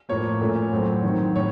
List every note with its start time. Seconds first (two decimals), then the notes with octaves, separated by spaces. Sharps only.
0.09 A2 F3 A#3 C#5
0.41 A#2 A3 C#4
0.73 A2 F#3 C4
1.04 D#3 F#3 C4
1.36 A2 C#5